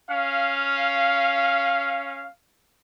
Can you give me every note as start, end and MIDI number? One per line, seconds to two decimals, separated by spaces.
0.10 2.27 61
0.10 2.27 77